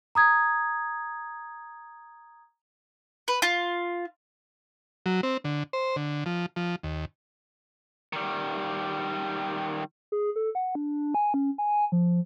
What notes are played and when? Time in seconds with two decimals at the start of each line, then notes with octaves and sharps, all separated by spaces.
0.15 A#5 D#6 G#6
3.28 B4
3.42 F4
5.06 F#3
5.23 C4
5.44 D3
5.73 C5
5.96 D3
6.26 F3
6.56 F3
6.83 D#2
8.13 D#3 G3
10.12 G#4
10.36 A4
10.55 F#5
10.75 D4
11.15 G#5
11.34 C#4
11.58 G#5
11.92 F3